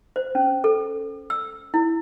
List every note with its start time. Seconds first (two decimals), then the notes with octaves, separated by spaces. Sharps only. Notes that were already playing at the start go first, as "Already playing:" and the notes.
0.16 C5
0.35 C#4
0.64 A4
1.30 E6
1.74 E4